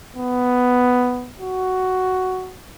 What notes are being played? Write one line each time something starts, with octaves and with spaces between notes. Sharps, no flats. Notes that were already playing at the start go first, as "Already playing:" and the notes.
B3
F#4